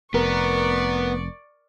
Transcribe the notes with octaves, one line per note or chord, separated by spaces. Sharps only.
F1 B3 A#4 D5 C#6